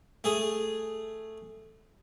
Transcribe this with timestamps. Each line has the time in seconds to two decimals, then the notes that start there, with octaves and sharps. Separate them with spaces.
0.24 A3 G#4